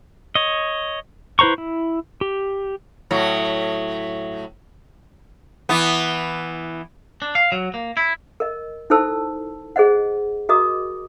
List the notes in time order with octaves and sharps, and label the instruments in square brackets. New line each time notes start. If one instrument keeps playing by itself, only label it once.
[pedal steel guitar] C#5 D#5
E4 B4 C5 A#5 C#6
E4
G4
[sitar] A2 F#3
E3 B3
[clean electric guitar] D4
F5
F#3
A#3
E4
[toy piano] A#4 D#5
D#4 E4 A4 C5 A5 E6
G#4 C5 D#5 F#5
F#4 A#4 D#5 A#5 D6 D#6